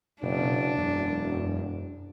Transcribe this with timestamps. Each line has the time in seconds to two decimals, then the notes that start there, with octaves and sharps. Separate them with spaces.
0.23 F#1 B2 D4
0.77 E1 F#2